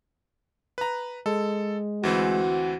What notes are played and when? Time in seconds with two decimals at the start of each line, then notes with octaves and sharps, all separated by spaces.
0.78 B4 A#5
1.26 G#3 A4
2.03 D2 E3 C4 F#4